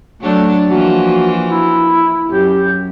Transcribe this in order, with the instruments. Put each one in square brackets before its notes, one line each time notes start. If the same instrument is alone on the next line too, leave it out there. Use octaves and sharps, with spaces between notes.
[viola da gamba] F#3 D4 [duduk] A3
[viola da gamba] E3 F3 A#3 [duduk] F#4
[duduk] E4
[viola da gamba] F#2 [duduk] G4